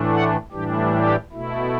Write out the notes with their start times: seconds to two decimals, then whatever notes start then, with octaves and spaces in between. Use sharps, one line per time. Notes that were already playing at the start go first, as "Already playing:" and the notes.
Already playing: A2 E3 A3 D4
0.12 F#5
0.52 A2 E3 G3 D4 G4
0.92 G4
1.32 B2 A3 E4